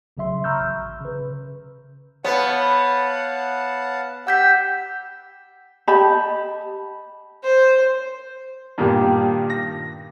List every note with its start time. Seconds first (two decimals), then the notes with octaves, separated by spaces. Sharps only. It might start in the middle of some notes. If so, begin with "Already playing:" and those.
0.17 A#1 C#3 F#3 E5 C6
0.44 A#5 B5 C#6 E6 F6 G6
0.60 A1
1.01 C#3 B4
2.25 B3 C#5 F5 F#5 A5
4.27 G4 F#5 E6 G6 B6
5.88 G4 D#5 A5 B5
7.43 C5
8.78 G2 A#2 D#3 G4
9.50 A#6